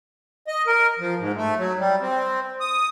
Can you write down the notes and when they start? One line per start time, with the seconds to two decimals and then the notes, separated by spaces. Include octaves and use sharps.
0.48 D#5
0.67 A#4
0.99 F3
1.19 G#2
1.36 A3
1.58 F#3
1.78 G3
2.01 C4
2.60 D#6